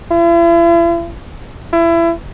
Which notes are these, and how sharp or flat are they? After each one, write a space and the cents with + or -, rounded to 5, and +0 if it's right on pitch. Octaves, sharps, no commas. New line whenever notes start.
E4 +45
E4 +25